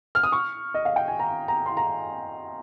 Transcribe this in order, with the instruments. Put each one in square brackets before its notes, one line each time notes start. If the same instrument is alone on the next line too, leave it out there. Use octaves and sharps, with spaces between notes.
[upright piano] F6
D#6
C#6
D#5
F5
G5
G#5
A#5
A#5
C6
A#5